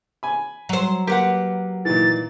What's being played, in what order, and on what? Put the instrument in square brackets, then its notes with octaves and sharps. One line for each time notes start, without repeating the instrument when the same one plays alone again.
[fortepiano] G#5 B5
[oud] F#3 C5
[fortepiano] A#3 [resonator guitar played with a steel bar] G4 B4 F#5
[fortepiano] A#2 D#3 E3 [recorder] A6